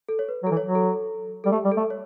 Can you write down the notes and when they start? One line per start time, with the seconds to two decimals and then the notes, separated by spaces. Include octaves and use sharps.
0.09 A4
0.19 C#5
0.29 B4
0.43 F#3
0.47 A4
0.51 E3
0.57 C#5
0.64 F#3
0.75 A4
1.44 G3 A4
1.52 A3 G4
1.65 G3
1.71 A4
1.77 A3
1.90 C#5